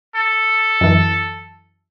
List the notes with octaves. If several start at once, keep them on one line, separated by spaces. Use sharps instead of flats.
A4
F#2 E3